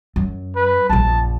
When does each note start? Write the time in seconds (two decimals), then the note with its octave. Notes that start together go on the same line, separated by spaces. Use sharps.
0.16 F#2
0.56 B4
0.89 A#1 F#2 A5